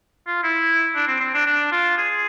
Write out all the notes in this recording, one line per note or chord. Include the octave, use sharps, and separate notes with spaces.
F4
E4
D4
C4
C4
D4
D4
F4
G#4